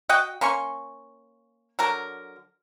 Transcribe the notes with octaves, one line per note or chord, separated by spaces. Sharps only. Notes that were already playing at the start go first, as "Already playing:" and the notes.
F#4 D#5 F#5 G5
A#3 C#4 C6 C#6
D3 F#3 A#4